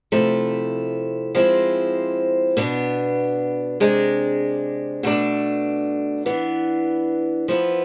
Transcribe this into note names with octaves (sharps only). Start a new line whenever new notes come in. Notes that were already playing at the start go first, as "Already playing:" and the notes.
C3 F3 A3 E4
F3 G#3 C4 E4
B2 B3 D4
C3 G#3 D4
B2 A3 D4
E3 B3 D4
F3 B3 E4